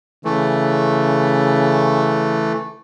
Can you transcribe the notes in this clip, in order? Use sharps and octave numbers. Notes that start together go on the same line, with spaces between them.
C#3 E3 A3